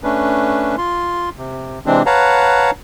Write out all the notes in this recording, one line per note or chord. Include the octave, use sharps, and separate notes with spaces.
A3 C#4 D4 B4
F4 C6
C3
C3 E3 G#3 C4 D4
B4 C#5 F5 F#5 A5 A#5